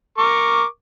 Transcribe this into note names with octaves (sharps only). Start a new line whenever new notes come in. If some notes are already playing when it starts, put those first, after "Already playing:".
A#4 C#6 D6